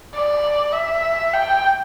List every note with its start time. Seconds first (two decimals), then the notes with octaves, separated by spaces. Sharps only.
0.14 D5
0.73 E5
1.33 G5